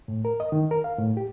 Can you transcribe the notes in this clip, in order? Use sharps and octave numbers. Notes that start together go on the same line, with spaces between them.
A2
A#4
D#5
D#3
A#4
F5
A2
G4